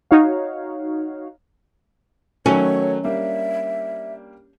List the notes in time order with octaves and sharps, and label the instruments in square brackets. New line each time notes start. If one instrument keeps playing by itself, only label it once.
[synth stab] D#4 F#4 C#5 F5
[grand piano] D#3 F#3 A3 [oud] C#4 [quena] C#5
[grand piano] G3 A#3 D4 [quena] E5